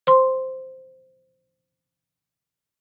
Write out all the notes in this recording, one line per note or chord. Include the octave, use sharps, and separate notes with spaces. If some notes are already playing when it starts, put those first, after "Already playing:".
C5 C6